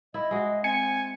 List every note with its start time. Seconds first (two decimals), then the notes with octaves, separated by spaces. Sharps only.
0.14 E4 D#5
0.31 G#3 F#4
0.64 C4 G#5 C#7